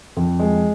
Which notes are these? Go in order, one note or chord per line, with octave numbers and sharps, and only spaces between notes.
F2
G#3